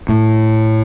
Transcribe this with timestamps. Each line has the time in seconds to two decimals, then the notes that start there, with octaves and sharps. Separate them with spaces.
0.09 A2